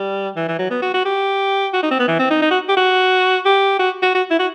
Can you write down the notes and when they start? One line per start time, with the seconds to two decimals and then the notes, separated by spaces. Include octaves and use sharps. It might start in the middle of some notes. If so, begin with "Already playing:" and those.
Already playing: G3
0.36 E3
0.48 E3
0.59 F#3
0.71 B3
0.82 F#4
0.94 F#4
1.05 G4
1.73 F#4
1.83 D#4
1.91 C4
2.00 B3
2.08 E3
2.19 C4
2.30 D#4
2.42 D#4
2.51 F#4
2.69 G4
2.77 F#4
3.45 G4
3.79 F#4
4.02 F#4
4.15 F#4
4.31 E4
4.39 F#4